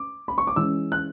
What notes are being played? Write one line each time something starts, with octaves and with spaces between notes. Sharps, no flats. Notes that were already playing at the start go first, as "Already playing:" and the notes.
Already playing: D6
B5
C#6
D6
E3 G#3 C#4 E6
F#6